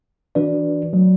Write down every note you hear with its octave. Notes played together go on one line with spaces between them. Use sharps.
E3 D4 F#4 B4 D5
F#3 A3 F#4 D5